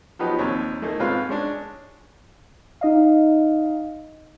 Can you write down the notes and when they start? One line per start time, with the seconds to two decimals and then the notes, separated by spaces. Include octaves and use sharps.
0.19 F3 F#3 B3 D#4 G4 B4
0.39 A#1 D#2 C4 C#5
0.82 A3 A#3 D#4 G#4
0.99 G#2 C4 C#4 F4 B4 F5
1.29 G#3 C#4 D4
2.81 D#4 D#5 F5